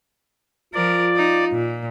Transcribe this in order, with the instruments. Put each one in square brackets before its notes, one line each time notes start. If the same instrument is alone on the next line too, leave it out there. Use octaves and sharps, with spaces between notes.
[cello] F3 A#4 [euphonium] F4 [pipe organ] D5
[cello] D#4
A#2